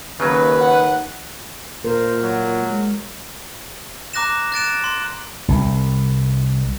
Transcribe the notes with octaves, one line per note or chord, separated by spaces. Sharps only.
D#2 C#3 F#3 B4
F#5
A#2 A#4 C5
F#3
G#3
A#5 D6 F#6 A#6 E7
F#6 A6 D7 E7
C6
C2